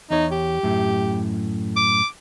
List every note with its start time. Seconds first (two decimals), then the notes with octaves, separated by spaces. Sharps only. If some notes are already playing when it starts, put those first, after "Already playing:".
0.10 E2 D#4 C#5
0.32 G4
0.63 F#2 A2
1.76 D6